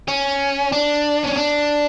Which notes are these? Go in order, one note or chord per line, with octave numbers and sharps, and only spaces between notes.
C#4
D4
C#4
D4